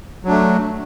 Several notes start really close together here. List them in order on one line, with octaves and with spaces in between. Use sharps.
F#3 D4 A3